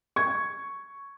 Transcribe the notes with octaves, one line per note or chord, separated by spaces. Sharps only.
C#6 G#6